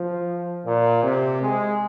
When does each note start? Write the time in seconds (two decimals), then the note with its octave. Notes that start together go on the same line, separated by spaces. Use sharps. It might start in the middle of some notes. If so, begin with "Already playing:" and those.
Already playing: F3
0.65 A#2
1.03 C3
1.41 G#3